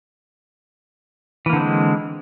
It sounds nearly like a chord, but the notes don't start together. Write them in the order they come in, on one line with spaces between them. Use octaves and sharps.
E3 A#3 D3 C4 G#3